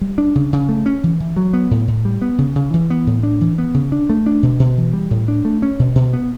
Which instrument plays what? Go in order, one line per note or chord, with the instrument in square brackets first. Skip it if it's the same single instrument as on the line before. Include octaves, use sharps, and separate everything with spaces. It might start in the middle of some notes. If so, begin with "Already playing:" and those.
[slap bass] G3
D4
C#3
C#3
A3
C#4
E3
E3
F#3
B3
A2
A2
G3
B3
C#3
C#3
E3
B3
A2
D4
E3
B3
C#3
D4
A3
D4
B2
B2
E3
G3
A2
D4
A3
C#4
B2
B2
B3